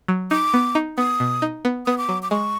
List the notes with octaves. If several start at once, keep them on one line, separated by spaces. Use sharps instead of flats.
F#3
D#4 D6
B3
D#4
B3 D#6
B2
D#4
B3
B3 D#6
D6
F#3
D6
G#3 C#6